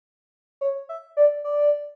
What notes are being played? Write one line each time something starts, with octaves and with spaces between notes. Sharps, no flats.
C#5
E5
D5
D5